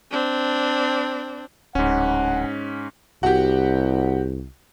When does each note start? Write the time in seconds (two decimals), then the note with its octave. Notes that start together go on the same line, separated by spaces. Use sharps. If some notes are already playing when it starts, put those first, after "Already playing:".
0.11 C4 D4
1.75 D1 G#2 C#4 F#5
3.23 C2 F#4 G4